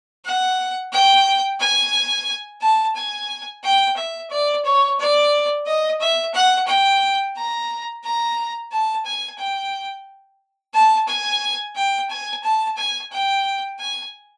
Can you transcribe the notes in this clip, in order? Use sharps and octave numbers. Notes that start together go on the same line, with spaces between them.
F#5
G5
G#5
A5
G#5
G5
E5
D5
C#5
D5
D#5
E5
F#5
G5
A#5
A#5
A5
G#5
G5
A5
G#5
G5
G#5
A5
G#5
G5
G#5